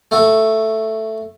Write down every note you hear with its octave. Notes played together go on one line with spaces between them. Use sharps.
A3 F#4